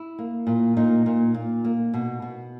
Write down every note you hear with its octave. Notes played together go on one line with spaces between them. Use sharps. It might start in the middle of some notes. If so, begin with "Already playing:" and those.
Already playing: E4
A#3
A#2
A#2 D#4
A#2
A#2
A#3
B2
B2